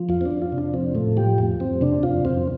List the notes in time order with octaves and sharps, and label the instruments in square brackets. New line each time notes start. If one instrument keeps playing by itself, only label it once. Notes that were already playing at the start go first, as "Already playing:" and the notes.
Already playing: [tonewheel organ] F3
F2 F4
C4
D4
F2
F4
C3
D4
F3 C4
A2 A3
F3 G4
F2
F2 C4
C3 D4
F2 F4
F2 C4